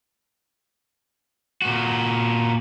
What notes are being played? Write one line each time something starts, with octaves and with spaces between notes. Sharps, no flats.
A#2 F#4